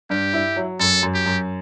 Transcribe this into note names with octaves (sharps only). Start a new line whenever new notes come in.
G2 G4
E4
F#3
F#2 A4
F#2
G4
F#2